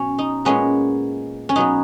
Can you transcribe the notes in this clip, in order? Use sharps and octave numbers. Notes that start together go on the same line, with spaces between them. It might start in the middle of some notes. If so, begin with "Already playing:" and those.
Already playing: B2 F#3 C#4
D#4
A#2 G#3 B3 C#4
C#4
B2 F#3 B3 D#4